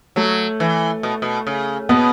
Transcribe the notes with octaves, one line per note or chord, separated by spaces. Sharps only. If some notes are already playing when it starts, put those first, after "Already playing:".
F#3 A3
E3
B2
B2
C#3
B2 B3